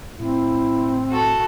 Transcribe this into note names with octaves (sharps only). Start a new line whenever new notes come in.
A2 C4 E4
F#4 A4